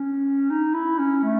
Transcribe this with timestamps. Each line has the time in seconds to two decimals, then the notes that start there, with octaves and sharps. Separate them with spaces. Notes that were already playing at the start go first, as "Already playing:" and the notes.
Already playing: C#4
0.50 D#4
0.74 E4
0.98 C#4
1.24 A3